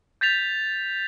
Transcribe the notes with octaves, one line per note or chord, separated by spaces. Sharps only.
G6 A6 B6 F7